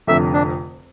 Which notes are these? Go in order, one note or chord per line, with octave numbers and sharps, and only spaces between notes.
F1 F2 D3 A3 E5
D4